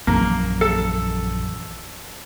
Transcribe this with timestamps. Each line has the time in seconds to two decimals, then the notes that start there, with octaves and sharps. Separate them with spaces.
0.07 A#1 F#2 E3 A#3
0.61 A4